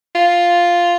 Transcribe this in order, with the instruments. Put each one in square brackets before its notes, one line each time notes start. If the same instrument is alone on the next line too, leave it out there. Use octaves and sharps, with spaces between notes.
[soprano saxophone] F4